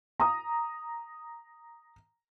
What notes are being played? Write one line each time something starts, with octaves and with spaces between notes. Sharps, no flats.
A#5 D#6